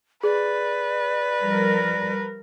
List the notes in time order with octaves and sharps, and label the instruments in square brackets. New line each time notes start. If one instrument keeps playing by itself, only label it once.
[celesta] G#4 [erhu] B4 [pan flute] D5
[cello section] F3 G3 A#4